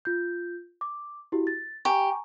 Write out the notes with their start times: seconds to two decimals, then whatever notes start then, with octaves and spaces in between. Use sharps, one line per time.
0.05 F4 G6
0.81 D6
1.32 E4 F#4 G4
1.47 A6
1.85 G4 G#5 A#5 C#6